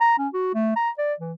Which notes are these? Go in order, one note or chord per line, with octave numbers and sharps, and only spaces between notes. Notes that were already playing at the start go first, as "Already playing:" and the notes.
A#5
C#4
F#4
A3
A#5
D5
E3